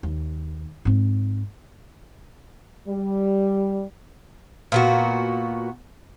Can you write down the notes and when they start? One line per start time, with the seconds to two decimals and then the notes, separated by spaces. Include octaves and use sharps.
0.03 D#2
0.85 G#2 C4
2.88 G3
4.72 A#2 B3 F#4